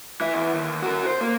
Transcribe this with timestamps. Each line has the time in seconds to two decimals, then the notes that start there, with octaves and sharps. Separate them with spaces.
0.21 E3 E5
0.32 E2
0.54 D#2
0.83 F#4 A#4
1.06 C5
1.21 A#3